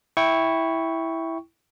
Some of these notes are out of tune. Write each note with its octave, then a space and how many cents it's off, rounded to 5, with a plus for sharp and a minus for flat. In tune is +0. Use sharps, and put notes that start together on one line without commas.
E4 -5 G5 +0 C#6 +0